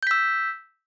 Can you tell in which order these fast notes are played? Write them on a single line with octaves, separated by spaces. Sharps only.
G6 B6 E6